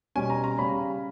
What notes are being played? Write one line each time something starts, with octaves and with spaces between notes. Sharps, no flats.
B2 G3 C#4 G#5
A#5
A#5
C#3 G3 C#4 B5